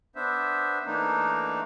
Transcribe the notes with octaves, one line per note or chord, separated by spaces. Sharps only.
B3 D4 C5 E5
E3 A3 A#3 D4 D#4